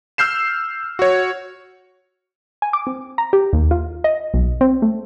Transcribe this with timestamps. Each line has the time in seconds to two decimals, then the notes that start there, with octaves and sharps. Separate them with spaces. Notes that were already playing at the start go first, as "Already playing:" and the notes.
0.18 E6 F6 G6 C7 E7
0.99 F#4 C#5
2.62 G#5
2.73 D6
2.87 C4
3.18 A#5
3.33 G4
3.53 D#2
3.71 F4
4.04 D#5
4.34 B1
4.61 C4
4.82 A3